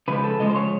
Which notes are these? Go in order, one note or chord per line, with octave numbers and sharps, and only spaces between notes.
C#3 F3 G#3 B4
A4
C#3 F3 G#3 D#5
C5
C#5